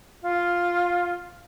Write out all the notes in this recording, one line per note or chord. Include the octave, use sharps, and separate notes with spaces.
F4